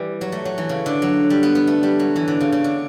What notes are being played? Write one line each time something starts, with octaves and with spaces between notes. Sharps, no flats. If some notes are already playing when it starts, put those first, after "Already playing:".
Already playing: E3 G3
F#3
A3
F#3
E3
C#3
D3
F#3
G3
B3
B3
A3
G3
F#3
E3
D3
C#3
C#3
D3